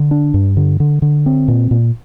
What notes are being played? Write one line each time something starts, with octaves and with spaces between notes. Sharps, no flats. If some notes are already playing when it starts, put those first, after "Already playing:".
Already playing: D3
D4
G2
D3
D3
D3
C4
A#2
A#2